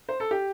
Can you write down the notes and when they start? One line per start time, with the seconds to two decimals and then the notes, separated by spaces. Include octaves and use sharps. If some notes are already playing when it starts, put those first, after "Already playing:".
0.09 C5
0.20 A4
0.31 G4